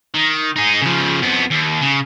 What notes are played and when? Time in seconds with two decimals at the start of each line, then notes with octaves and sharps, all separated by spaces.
0.14 D#3
0.56 D#4 G#4
0.82 C#3 F3
1.22 F2 B3
1.51 D#2
1.81 C#3